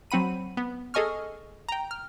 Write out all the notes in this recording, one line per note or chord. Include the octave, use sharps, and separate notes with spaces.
F#3 C4 F#5 B5 D#7
B3
G#4 A4 D#5 G#5 C#6 F6
G5 A#5
F6